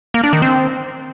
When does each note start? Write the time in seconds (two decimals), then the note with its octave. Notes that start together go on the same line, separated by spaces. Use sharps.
0.14 A#3
0.24 D4
0.33 D#3
0.42 C4